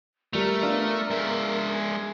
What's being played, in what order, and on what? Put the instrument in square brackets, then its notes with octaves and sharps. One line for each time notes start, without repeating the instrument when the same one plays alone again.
[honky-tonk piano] G3 F7 [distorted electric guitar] A3 [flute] A#4
[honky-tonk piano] B3 D4 F4
[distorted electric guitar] G#3 E5
[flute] G#5